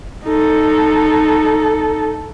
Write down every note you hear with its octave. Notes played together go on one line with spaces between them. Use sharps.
D#4 A4